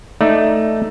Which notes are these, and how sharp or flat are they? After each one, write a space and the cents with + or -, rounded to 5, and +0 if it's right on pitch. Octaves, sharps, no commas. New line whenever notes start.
A3 +0 D#4 +0 D5 +0